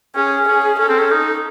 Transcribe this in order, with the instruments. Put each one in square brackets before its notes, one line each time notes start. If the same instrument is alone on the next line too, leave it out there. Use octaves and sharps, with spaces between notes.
[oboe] C#4 [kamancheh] G#4
[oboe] C#4 [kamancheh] G#4
[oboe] C#4 [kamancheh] A4
[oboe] C4
C#4
D#4